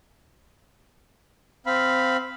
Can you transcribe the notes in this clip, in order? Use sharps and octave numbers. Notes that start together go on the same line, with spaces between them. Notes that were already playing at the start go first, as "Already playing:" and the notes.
C4 F5 B5